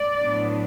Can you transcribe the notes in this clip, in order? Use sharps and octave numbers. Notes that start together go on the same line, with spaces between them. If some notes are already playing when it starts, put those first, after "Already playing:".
Already playing: D5
A2 F#3 B3 D4